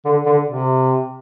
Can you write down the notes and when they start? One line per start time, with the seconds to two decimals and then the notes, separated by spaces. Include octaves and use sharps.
0.05 D3
0.26 D3
0.47 C3